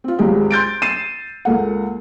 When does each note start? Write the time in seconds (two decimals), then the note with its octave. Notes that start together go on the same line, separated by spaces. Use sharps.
0.04 C4 F4
0.18 G#1 C#2 G4 G#4
0.50 C6 G6 A6 D7
0.82 A6 C7 D#7 E7
1.45 C#2 A#3 A4 F#5